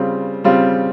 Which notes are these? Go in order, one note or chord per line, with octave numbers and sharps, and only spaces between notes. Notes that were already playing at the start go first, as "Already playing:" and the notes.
Already playing: C#3 G3 C4 F4
C#3 G3 C4 F4